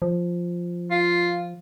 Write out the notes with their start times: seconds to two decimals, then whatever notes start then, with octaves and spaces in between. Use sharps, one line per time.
0.02 F3
0.91 F4